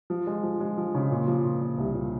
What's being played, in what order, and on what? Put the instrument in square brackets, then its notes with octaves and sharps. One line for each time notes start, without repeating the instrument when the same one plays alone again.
[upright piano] F3
G#3
F3
G#3
F3
C#3
A#2
F3
A#2
A#2
C2
A#2